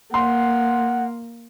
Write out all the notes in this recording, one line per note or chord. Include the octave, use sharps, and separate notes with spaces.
A#3 F#5 C6